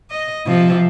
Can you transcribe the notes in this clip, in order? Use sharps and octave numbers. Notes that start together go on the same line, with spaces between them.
D#5
C3 F3